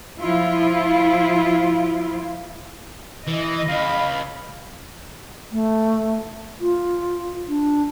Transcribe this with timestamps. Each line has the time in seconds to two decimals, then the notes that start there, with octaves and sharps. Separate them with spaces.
0.19 F3 E4 F4
3.27 E3 D#5
3.68 C#2 F5 B5
5.52 A3
6.61 F4
7.48 D4